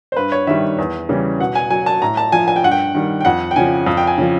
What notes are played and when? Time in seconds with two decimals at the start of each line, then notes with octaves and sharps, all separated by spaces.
0.12 C5
0.16 G2 B4
0.32 C#5
0.47 D#3 G3 E5
0.78 E2
1.09 C#3 E3 G3
1.40 B2 F#5
1.55 G#5
1.70 F#3 G#5
1.86 A5
2.02 A2 A#5
2.17 A5
2.32 F3 G#5
2.48 G#5
2.56 G5
2.63 G2 F#5
2.71 G5
2.95 D#3 G3
3.21 G5
3.25 F2 F#5
3.51 G5
3.56 C#3 F3 G#5
3.86 F2
3.97 G5
4.07 G#5
4.18 C#3 F3